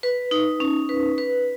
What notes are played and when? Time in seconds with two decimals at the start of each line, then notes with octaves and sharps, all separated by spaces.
0.03 B4
0.31 D#4
0.60 C#4
0.89 B4
1.18 B4